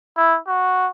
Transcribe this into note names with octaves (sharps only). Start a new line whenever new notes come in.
E4
F#4